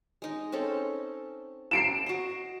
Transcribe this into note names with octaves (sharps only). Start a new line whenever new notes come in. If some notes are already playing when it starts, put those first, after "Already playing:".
G#3 D#4
C4 C#4 A4
C7 D7 E7
F#4 D#5